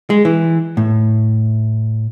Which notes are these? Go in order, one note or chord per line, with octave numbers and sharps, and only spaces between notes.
G#3
E3
A2